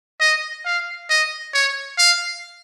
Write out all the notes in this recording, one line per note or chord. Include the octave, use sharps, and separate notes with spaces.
D#5
F5
D#5
C#5
F5